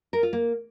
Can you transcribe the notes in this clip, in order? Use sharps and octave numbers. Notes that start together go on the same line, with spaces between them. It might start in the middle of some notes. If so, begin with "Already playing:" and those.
A#4
F4
A#3